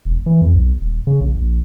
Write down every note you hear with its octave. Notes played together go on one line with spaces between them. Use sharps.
E1
E3
F2
B1
D#1
C#3
A#1
A#1